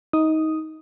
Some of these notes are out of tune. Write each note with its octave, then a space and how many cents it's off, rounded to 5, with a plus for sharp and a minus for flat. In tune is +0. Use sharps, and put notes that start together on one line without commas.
D#4 +20 D#6 +0